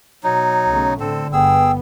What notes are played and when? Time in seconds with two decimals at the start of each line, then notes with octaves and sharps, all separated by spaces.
0.24 B2 F#3 D#4
0.67 B1 C#3 A3
1.00 A2 D3 C4 A4
1.33 G1 B3 G#4 G5 E6